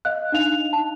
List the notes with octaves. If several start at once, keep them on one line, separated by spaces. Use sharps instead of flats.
D#5 F5 F#6
D4 D#4 F5 F7
A5